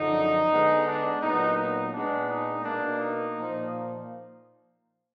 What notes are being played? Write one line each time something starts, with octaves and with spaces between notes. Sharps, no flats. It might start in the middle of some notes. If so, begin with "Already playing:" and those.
Already playing: F#2 D3 F3 D#4
D3 G#3 B3
D4
A#2 F#3 B3 D#4
D#4
A#2 G#3 B3 D4
D#4
B2 A#3 D4
D#4
A#2 F3 A#3